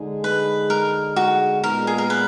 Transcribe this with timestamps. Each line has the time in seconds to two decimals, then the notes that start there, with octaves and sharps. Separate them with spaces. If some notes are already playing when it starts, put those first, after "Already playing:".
Already playing: D3 G#3 D#4 G#4
0.24 B4
0.70 A#4
1.16 F#4
1.63 A#2 G#3 B3 A#4
1.87 G#4
1.98 A#4
2.10 B4